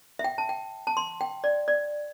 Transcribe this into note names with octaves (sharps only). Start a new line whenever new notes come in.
E5
G5
A5
G5
A5
C6
G5
D5
D5